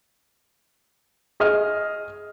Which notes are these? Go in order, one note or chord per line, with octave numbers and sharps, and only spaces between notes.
G#4 D#5 D#6 F6